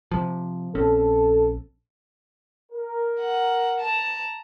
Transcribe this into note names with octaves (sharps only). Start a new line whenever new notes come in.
C3 F3
A#1 C4 C#4 A4
A#4
F#5
A5 A#5